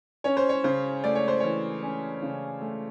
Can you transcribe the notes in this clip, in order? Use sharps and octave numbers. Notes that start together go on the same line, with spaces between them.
C#4 C#5
C5
C#5
C#3 C5
A3 D5
C#5
C5
E3 C#5
C#4
C#3
A3